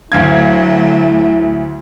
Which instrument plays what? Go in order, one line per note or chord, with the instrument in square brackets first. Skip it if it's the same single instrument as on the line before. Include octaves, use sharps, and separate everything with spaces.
[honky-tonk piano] D2 F5 G#6 [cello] F#3 A3 [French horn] E4